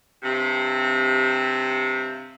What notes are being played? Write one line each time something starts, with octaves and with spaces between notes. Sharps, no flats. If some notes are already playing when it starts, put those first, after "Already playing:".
G2 C3